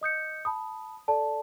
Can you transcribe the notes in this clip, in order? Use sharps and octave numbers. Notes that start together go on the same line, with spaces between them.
D#5 D#6 G6 C#7
A5 B5 D#6
A4 D5 A5